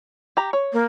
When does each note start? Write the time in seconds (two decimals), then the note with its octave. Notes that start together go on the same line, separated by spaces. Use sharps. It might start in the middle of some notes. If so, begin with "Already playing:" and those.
0.37 G4 A#5
0.53 C#5
0.73 A#3